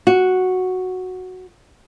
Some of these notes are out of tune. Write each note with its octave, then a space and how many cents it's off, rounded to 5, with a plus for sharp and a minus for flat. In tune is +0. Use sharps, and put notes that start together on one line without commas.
F#4 -5